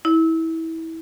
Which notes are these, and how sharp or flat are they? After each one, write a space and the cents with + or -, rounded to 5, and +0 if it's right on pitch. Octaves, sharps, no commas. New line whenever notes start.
E4 -25